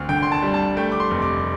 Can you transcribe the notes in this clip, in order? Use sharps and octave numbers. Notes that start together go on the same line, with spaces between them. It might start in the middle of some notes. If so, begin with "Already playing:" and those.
Already playing: D2 C4 F6
D3 G5
C6
A5
G3
A5
A3 G5
D6
C6
F1
D6